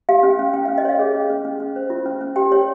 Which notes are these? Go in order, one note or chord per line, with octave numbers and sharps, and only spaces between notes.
G4 F5
C#4
C#4
C#4 G5
C#4 F5
D#5
C#5 F5
G#4
C#4
C#4
C#4
C#4
C5
F4
C#4
C#4
G4 G5
C#5